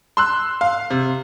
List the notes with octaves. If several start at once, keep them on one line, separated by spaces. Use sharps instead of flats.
C6 E6 F#6
F5
C3